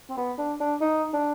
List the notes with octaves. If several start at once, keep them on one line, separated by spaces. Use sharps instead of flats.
C4
B3
D4
D4
D#4
D4